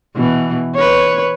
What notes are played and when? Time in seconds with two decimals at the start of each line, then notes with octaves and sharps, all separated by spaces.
0.15 B2 E3
0.75 B4 C#5